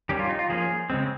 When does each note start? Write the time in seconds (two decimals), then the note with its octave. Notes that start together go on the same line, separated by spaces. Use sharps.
0.09 D#3 G3 C#4 G4
0.19 F4
0.29 D#4
0.39 F4
0.50 F3 A#3 C#4 G#4
0.90 C#3 G#3 C4